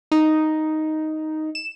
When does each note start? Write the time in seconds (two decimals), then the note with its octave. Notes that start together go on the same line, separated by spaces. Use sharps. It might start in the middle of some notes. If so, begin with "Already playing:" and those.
0.12 D#4
1.55 E7